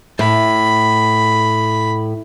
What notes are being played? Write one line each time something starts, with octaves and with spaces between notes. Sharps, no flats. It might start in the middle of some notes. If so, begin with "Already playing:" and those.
A2 B5